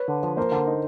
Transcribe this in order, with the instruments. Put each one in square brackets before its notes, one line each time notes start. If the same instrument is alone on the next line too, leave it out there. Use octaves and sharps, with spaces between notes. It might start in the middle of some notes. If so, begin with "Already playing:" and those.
Already playing: [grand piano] B4 C#5
[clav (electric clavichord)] D3
F3
[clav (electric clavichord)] A#3 [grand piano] A#4 C5
[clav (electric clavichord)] D3
D#4